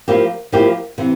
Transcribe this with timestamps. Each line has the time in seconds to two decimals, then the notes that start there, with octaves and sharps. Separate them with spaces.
0.08 F3 A#3 E4 G4
0.52 F3 A#3 E4 G4
0.98 C3 E3